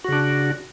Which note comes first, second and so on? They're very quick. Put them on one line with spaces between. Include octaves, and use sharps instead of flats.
F#4 C#3 D4